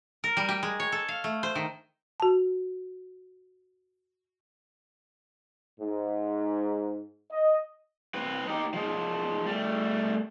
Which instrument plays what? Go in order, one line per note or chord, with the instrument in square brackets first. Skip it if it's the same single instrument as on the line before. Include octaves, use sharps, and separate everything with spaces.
[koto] A#4
G3
G4
G#3
C#5
A4
F5
A3
C5
D#3
[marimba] F#4 A5
[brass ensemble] G#2
D#5
[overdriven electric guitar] C4 B4
D#4 G4
F3 G#3
G3 A3